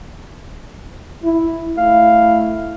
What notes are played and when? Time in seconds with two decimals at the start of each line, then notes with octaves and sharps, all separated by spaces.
1.23 E4
1.78 A3 E4 F5